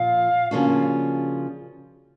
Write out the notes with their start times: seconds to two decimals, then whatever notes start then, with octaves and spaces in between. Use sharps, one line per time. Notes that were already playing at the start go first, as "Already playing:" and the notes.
Already playing: A#2 F3 F5
0.51 C#3 F3 A#3 D4 F#4